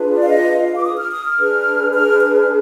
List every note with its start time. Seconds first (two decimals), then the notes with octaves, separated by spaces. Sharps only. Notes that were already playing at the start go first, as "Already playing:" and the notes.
Already playing: D4 F4 G#4 B4
0.11 D5
0.21 F5
0.29 D#5
0.56 F5
0.76 D6
0.84 D#6
0.98 F6
1.11 D#6
1.25 F6
1.38 D4 G#4 B4
1.93 F6
2.20 F6